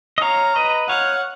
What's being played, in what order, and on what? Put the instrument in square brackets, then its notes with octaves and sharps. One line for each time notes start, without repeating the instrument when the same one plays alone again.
[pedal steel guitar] D#5
[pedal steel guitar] C#5 F5 [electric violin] A#5
[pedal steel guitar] B4 D#5
[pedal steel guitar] C#5 F5 [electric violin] F#5